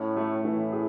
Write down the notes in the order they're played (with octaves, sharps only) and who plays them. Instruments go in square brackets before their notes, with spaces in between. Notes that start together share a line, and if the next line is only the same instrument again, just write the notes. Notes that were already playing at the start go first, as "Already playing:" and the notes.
Already playing: [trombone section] A2 [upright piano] C#4
[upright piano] A3
[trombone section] A2 [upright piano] E3
[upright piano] G#4